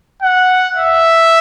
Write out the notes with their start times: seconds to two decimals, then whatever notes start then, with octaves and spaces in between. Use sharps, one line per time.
0.22 F#5
0.76 E5